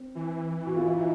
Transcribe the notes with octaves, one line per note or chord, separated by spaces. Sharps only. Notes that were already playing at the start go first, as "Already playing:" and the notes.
Already playing: C4
E3
F#4
F4
E4
D#4